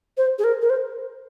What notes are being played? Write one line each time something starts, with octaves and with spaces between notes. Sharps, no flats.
C5
G#4
A#4
A#4
C5